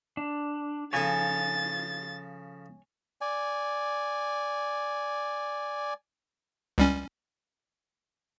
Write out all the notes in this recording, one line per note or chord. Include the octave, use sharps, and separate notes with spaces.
D4
C#3 F3 A4 C#5 G#5 A6
D5 G#5
C#2 G3 C#4